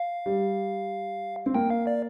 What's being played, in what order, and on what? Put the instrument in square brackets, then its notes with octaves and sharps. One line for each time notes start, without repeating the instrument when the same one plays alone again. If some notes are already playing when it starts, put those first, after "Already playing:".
Already playing: [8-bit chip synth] F5
[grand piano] G3
C4
[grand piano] A#3 [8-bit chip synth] G5
[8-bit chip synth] F5
D5